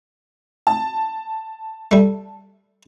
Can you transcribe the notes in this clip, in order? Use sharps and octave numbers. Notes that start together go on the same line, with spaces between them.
A5
G3 A3